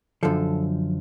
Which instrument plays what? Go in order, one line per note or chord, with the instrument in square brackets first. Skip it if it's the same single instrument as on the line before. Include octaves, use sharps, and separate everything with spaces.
[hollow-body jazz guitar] F#2 D3 F3 A4